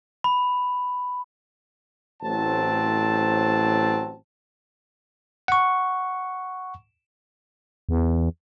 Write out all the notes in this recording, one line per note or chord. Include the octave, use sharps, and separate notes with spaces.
B5
A1 A2 F#3 C4 C5 A5
F#5 C#6
E2